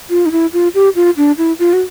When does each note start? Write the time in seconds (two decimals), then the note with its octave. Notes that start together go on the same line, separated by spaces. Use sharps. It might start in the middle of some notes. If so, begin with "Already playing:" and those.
0.10 F4
0.26 D#4
0.32 E4
0.53 F4
0.74 G4
0.95 F4
1.17 D4
1.38 E4
1.59 F4
1.73 F#4